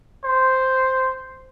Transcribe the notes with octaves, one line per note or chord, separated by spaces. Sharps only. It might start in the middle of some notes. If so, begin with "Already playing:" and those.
C5